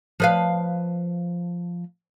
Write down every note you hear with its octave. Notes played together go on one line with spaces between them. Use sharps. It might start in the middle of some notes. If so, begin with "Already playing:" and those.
F3 B4 F5